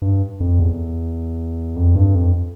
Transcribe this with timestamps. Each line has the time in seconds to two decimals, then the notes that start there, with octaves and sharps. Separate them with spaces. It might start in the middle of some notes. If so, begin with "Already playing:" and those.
0.02 G2
0.40 F2
0.59 E2
1.76 F2
1.95 G2
2.15 F2